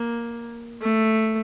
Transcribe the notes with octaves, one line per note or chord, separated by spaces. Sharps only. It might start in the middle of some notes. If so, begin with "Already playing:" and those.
Already playing: A#3
A3